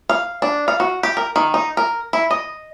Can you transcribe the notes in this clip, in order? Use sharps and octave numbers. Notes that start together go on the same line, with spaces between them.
F5
D4
F5
F#4
G4
A#4
D#3
D#4
A#4
E4
D#5